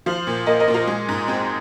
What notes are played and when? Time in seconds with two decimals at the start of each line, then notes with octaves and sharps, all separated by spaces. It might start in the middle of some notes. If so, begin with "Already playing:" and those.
0.06 F3 C5 F5
0.27 A#2
0.46 A#3 A#4 D#5
0.60 A#4 D#5
0.68 A#2
0.74 F4 A#4
0.87 G#3 G#4
1.09 G#2
1.28 C4 G#4 C5